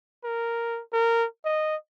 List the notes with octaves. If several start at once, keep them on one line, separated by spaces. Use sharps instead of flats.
A#4
A#4
D#5